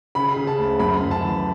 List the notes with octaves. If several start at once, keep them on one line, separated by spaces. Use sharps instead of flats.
C#3 B5
C#3
A5
D2
F#2 B5
F#2
A5
E3